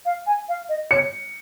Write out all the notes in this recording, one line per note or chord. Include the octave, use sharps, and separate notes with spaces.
F5
G#5
F5
D#5
C#5 C#7